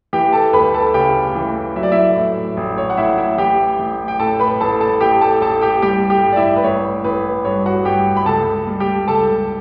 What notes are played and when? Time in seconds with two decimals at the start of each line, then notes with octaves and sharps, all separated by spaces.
0.13 E3 G4 G5
0.33 A4 A5
0.53 D2 B4 B5
0.74 A4 A5
0.94 C#3 G4 G5
1.35 E3
1.76 F#3 E5
1.83 D5
1.92 E4 E5
2.16 A2
2.57 A1
2.78 C#5
2.90 F#5
2.97 A1 E4 E5
3.18 E4 E5
3.38 E3 G4 G5
3.79 A1
4.08 G5
4.19 A2 A4 A5
4.39 B4 B5
4.60 A1 A4 A5
4.80 A4 A5
5.01 A1 G4 G5
5.21 A4 A5
5.41 A1 A4 A5
5.62 G4 G5
5.82 G3 G4 G5
6.10 G4 G5
6.23 G2
6.33 D5
6.36 E4 E5
6.56 B4
6.64 A1 C#5
7.04 A1 B4
7.45 G2 C#5
7.66 F#4 F#5
7.85 G2 G4 G5
8.17 B5
8.26 C#2 A4 A5
8.67 G3
8.80 G4 G5
9.08 C#2 A4 A5